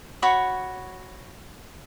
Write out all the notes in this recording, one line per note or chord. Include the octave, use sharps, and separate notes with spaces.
F#4 C#5 B5 C#6